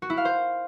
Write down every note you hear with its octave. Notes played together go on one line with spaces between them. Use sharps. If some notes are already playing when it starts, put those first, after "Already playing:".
F#4
E4
F5
C5